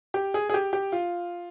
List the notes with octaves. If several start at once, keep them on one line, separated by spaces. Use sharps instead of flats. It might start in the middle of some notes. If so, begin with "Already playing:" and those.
G4
G#4
G#4
G4
G4
F4